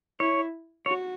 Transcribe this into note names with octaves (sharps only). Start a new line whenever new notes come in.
E4 C#5
F#4 C#5